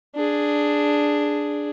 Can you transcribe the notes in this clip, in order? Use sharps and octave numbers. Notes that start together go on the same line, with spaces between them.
D4 G#4